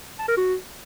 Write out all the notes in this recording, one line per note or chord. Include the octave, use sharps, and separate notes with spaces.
A5
A#4
F#4